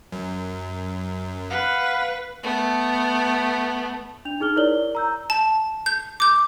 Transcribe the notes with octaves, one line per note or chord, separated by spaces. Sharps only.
F#2
B4 F5 F#5
A3 B3
D4 F7
D#4 G#4 F6 G7
E4 A#4 C#5 D5 F#7 G7
A#5 E6 G6
A5
G6
D6 G6